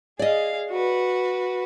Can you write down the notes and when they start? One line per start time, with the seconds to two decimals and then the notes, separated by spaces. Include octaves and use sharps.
0.19 G#4 D5 D#5 F5
0.70 F#4 B4